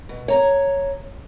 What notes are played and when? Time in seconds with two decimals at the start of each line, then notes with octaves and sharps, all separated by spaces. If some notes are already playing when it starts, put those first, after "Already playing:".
0.09 B2
0.28 C#5 A#5